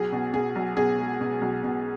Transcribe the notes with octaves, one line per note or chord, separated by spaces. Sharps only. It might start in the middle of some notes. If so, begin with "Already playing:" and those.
Already playing: B1 G#4
B2
B2 G#4
B1
B2 G#4
G#3
B2
B1
B2